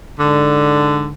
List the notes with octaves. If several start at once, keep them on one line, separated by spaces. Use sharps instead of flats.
G#2 D3